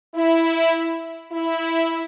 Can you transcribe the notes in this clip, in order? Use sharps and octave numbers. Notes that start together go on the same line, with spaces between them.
E4
E4